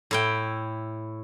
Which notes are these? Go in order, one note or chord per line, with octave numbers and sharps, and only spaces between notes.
A2 E4 G5